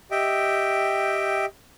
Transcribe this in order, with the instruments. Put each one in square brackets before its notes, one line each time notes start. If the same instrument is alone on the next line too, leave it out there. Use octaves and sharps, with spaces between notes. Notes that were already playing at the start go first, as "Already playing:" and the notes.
[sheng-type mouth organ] G4 D#5 E5 G5